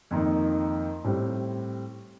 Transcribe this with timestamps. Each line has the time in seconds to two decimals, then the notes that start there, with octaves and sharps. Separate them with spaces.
0.11 F2 D#3 A#3 D#4
1.04 A2 G3 C4